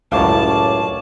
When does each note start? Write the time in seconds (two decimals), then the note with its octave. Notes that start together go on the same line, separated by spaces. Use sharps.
0.12 C#2 F#2 A2 C#5 D5 F5 A5